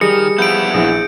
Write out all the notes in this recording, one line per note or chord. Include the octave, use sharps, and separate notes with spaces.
D#3 G3 G#4 C#7
F3 B3 E4 G6 D7
A#1 E3 G#4